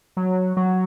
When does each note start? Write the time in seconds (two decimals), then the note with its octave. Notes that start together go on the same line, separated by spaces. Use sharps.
0.17 F#3
0.57 F#3